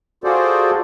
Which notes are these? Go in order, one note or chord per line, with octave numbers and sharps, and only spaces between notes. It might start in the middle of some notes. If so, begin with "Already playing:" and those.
F4 F#4 G#4 A4 C5 D5